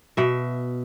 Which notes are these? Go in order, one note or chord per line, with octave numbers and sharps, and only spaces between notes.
B2 E5